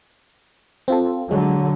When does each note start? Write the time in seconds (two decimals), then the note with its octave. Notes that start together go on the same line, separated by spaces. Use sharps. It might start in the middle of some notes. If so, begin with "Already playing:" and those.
0.88 C4 F4 A4
1.31 D3 F#3 G#3